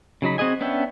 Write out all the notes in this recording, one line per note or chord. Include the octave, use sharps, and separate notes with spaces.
C#3 F#3 D#4 B5
C4 F#4 G#4 D#5 G#5
B3 C#4 D4 E5 G5